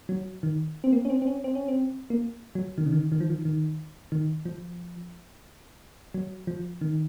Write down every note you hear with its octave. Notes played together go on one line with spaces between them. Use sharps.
F#3
D#3
C4
A#3
C#4
C4
C4
C#4
C4
C#4
C4
A#3
F#3
D#3
C#3
D#3
D#3
F3
D#3
D#3
D#3
F3
F#3
F3
D#3